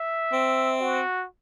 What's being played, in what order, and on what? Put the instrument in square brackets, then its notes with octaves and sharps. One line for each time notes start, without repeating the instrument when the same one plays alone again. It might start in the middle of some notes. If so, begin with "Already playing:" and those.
Already playing: [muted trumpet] E5
[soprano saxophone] C4
[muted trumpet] F#4